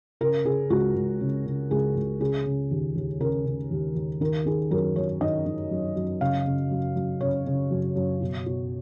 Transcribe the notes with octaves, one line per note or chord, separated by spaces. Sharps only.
C#3 A#4
C#3 G#4
C#2 F#4
C#2
C#3
C#3
C#2 G#4
C#2
C#3 G#4
C#3
D#2
D#2
C#3 A#4
C#3
D#2
D#2
D#3 A#4
D#3 G#4
F#2 A#4
F#2 C#5
D#3 D#5
D#3
F#2
F#2
C#3 F5
C#3
F#2
F#2
C#3 C#5
C#3
F#2
F#2
B2
B2